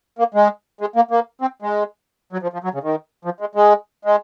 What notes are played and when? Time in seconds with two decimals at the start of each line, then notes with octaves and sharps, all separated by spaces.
0.19 A#3
0.34 G#3
0.81 G#3
0.96 A#3
1.11 A#3
1.41 C4
1.62 G#3
2.33 F#3
2.43 F3
2.53 F3
2.64 F#3
2.74 C#3
2.83 D#3
3.25 F3
3.40 G#3
3.55 G#3
4.05 G#3